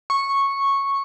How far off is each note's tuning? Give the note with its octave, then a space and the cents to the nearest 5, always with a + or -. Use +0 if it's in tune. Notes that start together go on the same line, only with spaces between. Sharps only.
C#6 -10